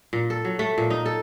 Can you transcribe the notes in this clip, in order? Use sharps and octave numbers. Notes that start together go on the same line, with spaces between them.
A#2
A4
F#3
A3
A#2
D#4
A4